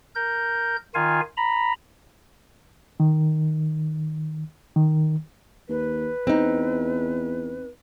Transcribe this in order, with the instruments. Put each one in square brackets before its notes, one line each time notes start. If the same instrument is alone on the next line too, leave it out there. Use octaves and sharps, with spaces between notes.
[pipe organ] A#4 G6
D#3 F4 F5 G#5
A#5 B5
[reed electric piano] D#3
D#3
[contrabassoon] D#2 [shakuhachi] B4
[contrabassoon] E2 [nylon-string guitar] C4 D#4